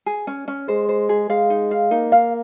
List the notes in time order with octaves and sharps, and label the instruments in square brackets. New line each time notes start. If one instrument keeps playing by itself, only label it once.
[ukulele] G#4
C#4
C#4
[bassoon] G#3 [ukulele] C5
[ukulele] C5
G#4
[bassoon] G#3 [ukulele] F5
[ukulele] D#4
F5
[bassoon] A#3 [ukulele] D#4
[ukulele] F5